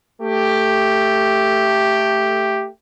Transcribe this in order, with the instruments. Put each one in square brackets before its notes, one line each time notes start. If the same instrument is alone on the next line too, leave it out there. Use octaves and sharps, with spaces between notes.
[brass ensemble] A3 G4